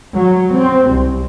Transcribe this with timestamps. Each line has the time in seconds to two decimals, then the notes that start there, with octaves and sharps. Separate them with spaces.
0.15 F#3
0.56 C4
0.88 C2